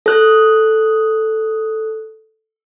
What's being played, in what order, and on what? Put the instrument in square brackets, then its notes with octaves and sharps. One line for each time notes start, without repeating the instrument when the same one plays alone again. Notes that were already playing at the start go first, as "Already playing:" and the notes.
[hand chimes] A4 F#6